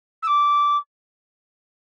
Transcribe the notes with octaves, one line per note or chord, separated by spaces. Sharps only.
E6
D6